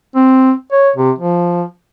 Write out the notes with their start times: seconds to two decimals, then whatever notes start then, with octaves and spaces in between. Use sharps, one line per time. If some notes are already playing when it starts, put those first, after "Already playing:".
0.15 C4
0.72 C#5
0.96 C3
1.19 F3